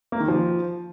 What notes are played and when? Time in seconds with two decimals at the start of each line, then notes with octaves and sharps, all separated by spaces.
0.12 A#3
0.20 D#3
0.28 F3